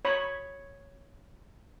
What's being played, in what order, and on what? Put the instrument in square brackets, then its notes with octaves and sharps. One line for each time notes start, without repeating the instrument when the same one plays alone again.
[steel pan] C#5 B5